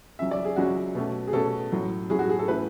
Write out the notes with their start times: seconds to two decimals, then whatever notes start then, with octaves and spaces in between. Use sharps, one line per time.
0.19 C#2 C#3 F#3 C#4 E5
0.31 D5
0.45 G#4
0.56 C#2 C#3 F#3 C#4 F#4
0.95 B2 A3 C#4
1.27 G#4
1.33 B2 A3 C#4 A4
1.71 A2 F#3 C#4
2.10 A2 F#3 C#4 G#4
2.19 F#4
2.29 G#4
2.39 A4
2.48 A2 E3 A3 C#4 B4